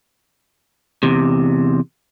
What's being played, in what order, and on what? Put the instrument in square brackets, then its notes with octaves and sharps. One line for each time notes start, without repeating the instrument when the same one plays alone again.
[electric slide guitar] E2 C3